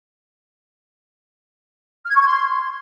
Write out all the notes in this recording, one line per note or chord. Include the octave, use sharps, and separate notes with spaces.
F6
G#6
C#6
G#6
C6